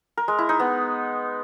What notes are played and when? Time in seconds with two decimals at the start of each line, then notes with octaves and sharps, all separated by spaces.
0.17 A#4
0.28 G#3
0.38 E4
0.49 D#4
0.59 B3